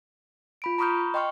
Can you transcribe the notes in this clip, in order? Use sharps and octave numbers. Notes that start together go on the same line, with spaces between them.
F4 B5 D7
A#5 B5 C#6 D#6 F6 G6
D#5 G5 C6 C#6 F6